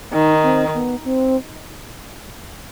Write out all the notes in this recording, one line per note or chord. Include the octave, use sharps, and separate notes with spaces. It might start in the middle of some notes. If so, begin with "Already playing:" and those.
D#3 D#4
C4
B3
C4